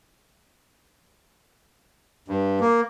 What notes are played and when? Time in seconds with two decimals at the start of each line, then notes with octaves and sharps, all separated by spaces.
2.28 G2
2.61 A#3